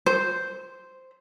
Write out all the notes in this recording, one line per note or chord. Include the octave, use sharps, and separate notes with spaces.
C5